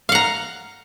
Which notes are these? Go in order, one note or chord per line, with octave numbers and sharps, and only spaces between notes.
F5 F#5 A#5